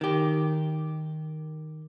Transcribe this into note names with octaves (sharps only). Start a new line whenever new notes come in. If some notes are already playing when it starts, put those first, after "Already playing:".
D#3 G4